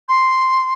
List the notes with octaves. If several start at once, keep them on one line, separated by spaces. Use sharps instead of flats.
C6